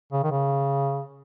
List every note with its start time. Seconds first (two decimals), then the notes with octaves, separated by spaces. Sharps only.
0.12 C#3
0.23 D#3
0.31 C#3